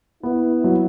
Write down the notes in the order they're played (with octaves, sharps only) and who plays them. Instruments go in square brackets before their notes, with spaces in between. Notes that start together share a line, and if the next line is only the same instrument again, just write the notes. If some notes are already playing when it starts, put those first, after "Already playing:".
[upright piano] B3 [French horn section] E4
[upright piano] F#3